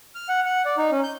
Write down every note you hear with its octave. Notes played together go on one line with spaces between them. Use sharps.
F6
F#5
F#5
D5
D#4
C#4
G6